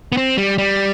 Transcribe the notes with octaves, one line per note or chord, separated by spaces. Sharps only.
B3
C4
G3
G3